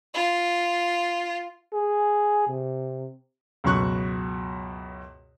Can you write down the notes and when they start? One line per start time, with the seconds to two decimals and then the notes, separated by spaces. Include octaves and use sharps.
0.14 F4
1.74 G#4
2.49 C3
3.64 C#2 F#2 B2 C#6 F#6